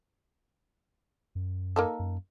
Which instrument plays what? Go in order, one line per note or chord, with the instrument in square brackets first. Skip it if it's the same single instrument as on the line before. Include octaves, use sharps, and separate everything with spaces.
[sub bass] F#2
[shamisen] A#3 D#4 A4
[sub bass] F#2